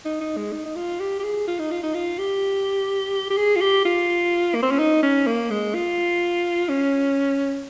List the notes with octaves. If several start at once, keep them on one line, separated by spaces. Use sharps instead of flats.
D#4
D#4
G#3
D#4
D#4
F4
G4
G4
G#4
F4
D#4
F4
D#4
F4
G4
G4
G#4
F4
G4
F4
A#3
C4
C#4
D#4
C#4
A#3
G#3
F4
C#4